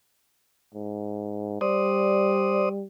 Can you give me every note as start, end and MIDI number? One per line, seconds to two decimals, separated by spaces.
0.74 1.58 44
1.61 2.85 55
1.61 2.69 72
1.61 2.69 74
1.61 2.69 87